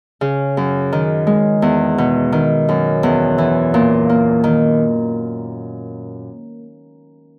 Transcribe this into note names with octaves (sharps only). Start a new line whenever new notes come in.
C#3
F#2
D#3
G#3
E2
B2
D#3
F#2
E2
E3
A#2
A#3
D#3